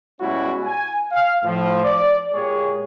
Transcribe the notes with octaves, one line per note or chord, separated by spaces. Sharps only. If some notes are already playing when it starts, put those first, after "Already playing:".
B2 G3 G#3 C#4 E4 F#4
G#5
F5
A2 F3
D5
A#2 G#3 G4 G#4 C#5